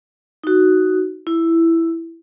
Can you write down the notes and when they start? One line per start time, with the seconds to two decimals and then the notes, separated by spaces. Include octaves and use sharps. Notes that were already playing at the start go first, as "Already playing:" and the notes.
0.44 D#4 F#4
1.27 E4